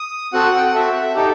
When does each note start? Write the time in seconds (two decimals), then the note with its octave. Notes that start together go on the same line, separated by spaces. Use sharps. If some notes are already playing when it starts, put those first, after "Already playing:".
Already playing: D#6
0.33 C4 F#4 A4 F#5
0.57 G5
0.66 F#5
0.74 C4 F#4 A4 E5
1.15 D#4 G4 A4